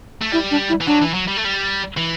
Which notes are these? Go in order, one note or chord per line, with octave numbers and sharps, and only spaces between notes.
A3
G3 E4
D4
E4
E3
F#3 D4
E3
F#3
G3
A3
G3
E3